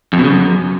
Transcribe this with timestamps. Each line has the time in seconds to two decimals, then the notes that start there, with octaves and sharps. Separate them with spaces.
0.13 F2
0.18 B2
0.24 C#3
0.30 F#2